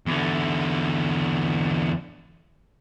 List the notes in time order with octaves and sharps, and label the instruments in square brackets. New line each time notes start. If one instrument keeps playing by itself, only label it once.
[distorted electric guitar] E2 D3